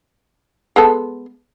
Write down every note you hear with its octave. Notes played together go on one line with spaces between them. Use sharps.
G#3 B3 A4